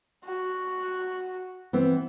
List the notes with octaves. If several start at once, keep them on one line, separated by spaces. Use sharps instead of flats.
F#4
E3 B3 C4